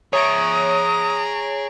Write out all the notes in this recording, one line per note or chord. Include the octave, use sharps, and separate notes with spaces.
G#4 C#5 E5 A#5 D#6 D7